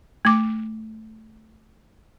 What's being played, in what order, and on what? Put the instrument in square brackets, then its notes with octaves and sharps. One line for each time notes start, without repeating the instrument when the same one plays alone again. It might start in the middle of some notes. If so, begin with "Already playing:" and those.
[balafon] A3 D6